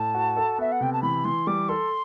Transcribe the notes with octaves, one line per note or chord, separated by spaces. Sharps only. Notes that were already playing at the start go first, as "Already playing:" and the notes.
Already playing: A2 A5
F#4
A4
B3 E5
F#5
C3 G5
A5
E3 B5
E3 C6
G3 D6
A4 C6